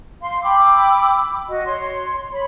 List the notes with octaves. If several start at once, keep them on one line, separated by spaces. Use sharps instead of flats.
F5 C6
G5 B5 D6 E6
F#4 D#5
C#5 C6
C#5 B5